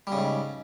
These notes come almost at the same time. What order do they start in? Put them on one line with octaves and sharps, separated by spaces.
G3 C#3 G#2